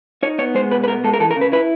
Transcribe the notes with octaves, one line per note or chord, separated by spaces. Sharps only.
D#4 C#5
B3 C#5
G#3 C5
B2 B4
B4
B3 A#4
G#3 A4
A#4
E3 A4
A#4
C#3
B4
E4 B4